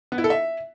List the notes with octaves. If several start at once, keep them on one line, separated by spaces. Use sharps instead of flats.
B3
E4
A4
E5